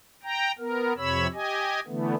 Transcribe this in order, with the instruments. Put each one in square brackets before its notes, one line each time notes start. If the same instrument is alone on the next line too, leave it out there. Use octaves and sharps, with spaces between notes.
[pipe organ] G5 A#5
B3 A#4
F2 C3 C#5 B5 E6
G4 D#5 G#5
D3 E3 A3 B3